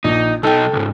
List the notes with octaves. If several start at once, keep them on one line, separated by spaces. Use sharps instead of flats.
A#1 D#4
B1 D#4 A4 G5
C#2 G#2